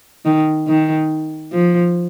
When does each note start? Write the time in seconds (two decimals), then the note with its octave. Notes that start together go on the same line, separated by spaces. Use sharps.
0.25 D#3
0.67 D#3
1.52 F3